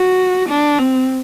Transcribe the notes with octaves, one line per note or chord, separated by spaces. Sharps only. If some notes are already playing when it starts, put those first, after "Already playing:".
Already playing: F#4
D4
C4